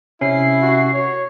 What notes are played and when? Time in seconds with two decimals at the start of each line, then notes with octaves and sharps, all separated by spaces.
0.21 C3 C#4 E4 C7
0.62 F#4
0.94 C#5